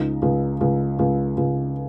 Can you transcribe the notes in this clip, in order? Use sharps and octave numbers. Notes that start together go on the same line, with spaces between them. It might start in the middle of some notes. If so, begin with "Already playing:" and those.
Already playing: C#2 D#4
C#2
C#2
C#2
C#2